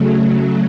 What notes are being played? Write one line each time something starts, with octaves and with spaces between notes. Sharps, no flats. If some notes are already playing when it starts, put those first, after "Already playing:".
Already playing: C#3 F#3 A3